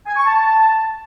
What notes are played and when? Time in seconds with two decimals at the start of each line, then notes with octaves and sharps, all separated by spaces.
0.06 G#5
0.16 C#6
0.25 A5